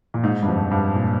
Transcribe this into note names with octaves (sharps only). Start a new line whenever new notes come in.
A#2
G#2
G2
F2
G2
A#2